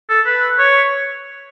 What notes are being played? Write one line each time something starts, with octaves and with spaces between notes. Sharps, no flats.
A4
B4
C#5